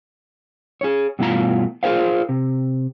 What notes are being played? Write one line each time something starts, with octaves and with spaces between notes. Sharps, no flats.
G#4 C#5
G2 B2 E3 A3 F4 A#5
F4 G#4 A#4 C5 F5
C3